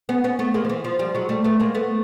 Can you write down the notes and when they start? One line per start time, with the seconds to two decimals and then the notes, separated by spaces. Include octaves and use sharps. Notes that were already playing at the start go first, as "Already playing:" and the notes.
0.09 B3 C#4
0.24 B3 C#4
0.39 A3 B3
0.54 G#3 A#3
0.65 F3
0.69 E3
0.84 F3
0.99 F3 G3
1.15 F#3 G#3
1.29 G3 A3
1.44 A3 B3
1.60 G#3 A#3
1.74 A3 B3